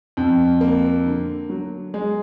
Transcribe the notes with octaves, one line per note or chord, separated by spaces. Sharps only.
F2
A#3
D3
F#3
G#3